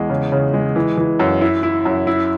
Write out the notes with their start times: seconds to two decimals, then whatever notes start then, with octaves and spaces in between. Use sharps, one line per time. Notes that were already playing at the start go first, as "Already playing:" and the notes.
Already playing: E2 G#3
0.10 C#3
0.32 C#3
0.54 G#3
0.76 E3
0.98 E3
1.20 F#2
1.41 E4
1.63 E4
1.85 F#2
2.07 E4